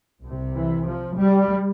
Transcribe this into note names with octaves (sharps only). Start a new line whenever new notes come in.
C2 C3
E3
F3
G3